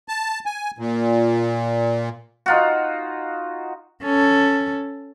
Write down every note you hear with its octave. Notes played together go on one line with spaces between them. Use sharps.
A5
G#5
A#2
D#4 F4 F#4
C#4 A4